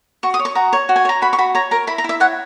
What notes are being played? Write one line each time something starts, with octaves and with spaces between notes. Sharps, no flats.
F#4 C#6
D#6
C#5
C#6
F#4 A#5
C#5
F#4
G#5
C#5 A#5
F#4 B5
C#6
F#4 B5
C#5 A#5
A#4 A#5
E4 B5
A#5
E4 E5
C#5 F#5